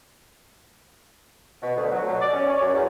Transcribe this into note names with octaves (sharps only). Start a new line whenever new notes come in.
B2
D2
F#3
B2
D5
C#4
C#5
F#2
E2